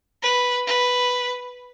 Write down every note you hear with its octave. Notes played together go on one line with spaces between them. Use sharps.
B4
B4